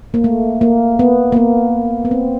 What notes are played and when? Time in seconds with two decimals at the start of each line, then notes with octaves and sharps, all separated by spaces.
0.14 A#3
0.24 A3
0.61 A#3
0.99 B3
1.32 A#3
1.36 B3
2.05 B3
2.11 C4